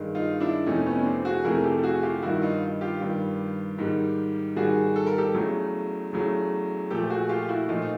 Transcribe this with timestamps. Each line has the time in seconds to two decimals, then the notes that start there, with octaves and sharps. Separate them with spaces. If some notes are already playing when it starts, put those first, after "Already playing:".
Already playing: G2 D#3 G#3
0.15 D#4 F4
0.40 D4 E4
0.66 F2 C3 E3 A3 C#4 D#4
0.86 B3 C#4
0.99 C#4
1.05 C4 D4
1.25 F#4 G#4
1.45 F2 C3 E3 A3 G#4 A#4
1.64 G4 A4
1.79 A4
1.83 F#4 G#4
2.03 F4 G4
2.22 G2 D#3 G3 E4 F#4
2.42 D#4 F4
2.81 F4 G4
3.00 G2 D#3 G3
3.78 G#2 D#3 G3
4.56 G#2 D#3 G3 F#4 G#4
4.96 A4
5.07 A#4
5.18 G4 A4
5.34 E2 C#3 F#3 A3
6.13 E2 C#3 F#3 A3
6.90 A#2 F3 A3 G4 A4
7.10 F#4 G#4
7.29 F4 G4
7.49 E4 F#4
7.68 A#2 F3 A3 D#4 F4
7.82 D#4